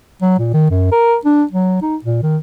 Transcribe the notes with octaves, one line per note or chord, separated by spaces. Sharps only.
F#3
A#2
D#3
F#2
A#4
D4
F#3
D#4
A#2
D#3